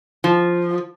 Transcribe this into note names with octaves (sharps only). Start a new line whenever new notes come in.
F3